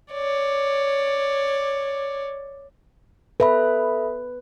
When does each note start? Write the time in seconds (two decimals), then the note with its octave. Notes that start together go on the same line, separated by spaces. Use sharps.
0.12 C#5 D5
3.40 A4 B4 E5 B5